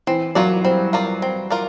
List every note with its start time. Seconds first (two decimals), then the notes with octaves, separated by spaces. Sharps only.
0.07 E3 C4
0.35 F#3 F4 A#4 D5
0.64 G3 C4
0.93 F4 A#4 D5
1.22 C4
1.50 F4 A#4 D5